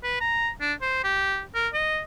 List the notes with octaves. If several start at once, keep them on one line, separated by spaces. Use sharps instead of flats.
B4
A#5
D4
C5
G4
A#4
D#5